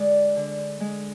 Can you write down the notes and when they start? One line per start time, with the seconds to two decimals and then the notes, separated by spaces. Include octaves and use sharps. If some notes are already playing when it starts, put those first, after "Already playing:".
Already playing: D3 G#3 D5
0.36 D3
0.80 G#3